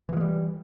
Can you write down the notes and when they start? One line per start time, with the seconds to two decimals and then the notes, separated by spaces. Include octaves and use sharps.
0.09 E3
0.13 F3
0.17 G#3
0.21 G3